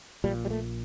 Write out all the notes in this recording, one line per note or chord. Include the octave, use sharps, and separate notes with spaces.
A#1 A#2 G3
G3
A3